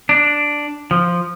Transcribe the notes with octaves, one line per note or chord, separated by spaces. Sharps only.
D4
F3